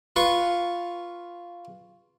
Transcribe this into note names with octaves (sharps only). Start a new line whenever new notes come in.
F4 B4 F5 C#6